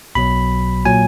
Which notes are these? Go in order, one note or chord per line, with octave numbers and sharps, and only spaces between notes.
B1 B2 F#3 B5
A#2 F#3 G#5